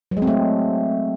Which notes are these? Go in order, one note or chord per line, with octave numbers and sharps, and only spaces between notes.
F#3
G#3
C4
A3